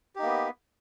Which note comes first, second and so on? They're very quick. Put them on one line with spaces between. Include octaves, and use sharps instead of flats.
G4 D#4 A#3 B3